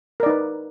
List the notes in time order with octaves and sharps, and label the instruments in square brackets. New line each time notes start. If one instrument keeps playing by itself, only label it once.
[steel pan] A#4
D5
D#4
B4